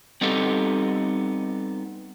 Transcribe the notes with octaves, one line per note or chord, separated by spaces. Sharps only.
G3 B3 C4 D#4 G4 A4